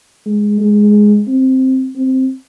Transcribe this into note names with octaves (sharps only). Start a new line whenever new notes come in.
G#3
G#3
C4
C4